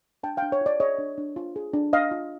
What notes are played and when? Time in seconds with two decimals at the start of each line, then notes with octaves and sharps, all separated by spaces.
0.23 D4 G5 A5
0.37 D4 F5 G5
0.52 C#5
0.61 F4 D5
0.80 G#4 C#5 D#5
0.98 D4
1.18 D4
1.36 F4
1.56 G#4
1.74 D4
1.93 D4 D#5 F5
2.11 F4